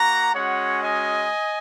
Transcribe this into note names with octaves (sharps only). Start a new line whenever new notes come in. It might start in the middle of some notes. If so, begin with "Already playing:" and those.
Already playing: A#3 F#4 F#5 A#5
G#3 C#4 F#4 C#5 F#5
D#5 G#5